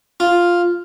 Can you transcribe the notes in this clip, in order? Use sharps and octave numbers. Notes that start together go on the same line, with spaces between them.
F4